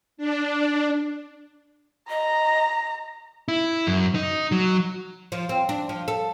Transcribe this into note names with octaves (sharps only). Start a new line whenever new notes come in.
D4
D#5 A#5
E4
F#2
D#4
F#3
F3
C4
D4
F3
A4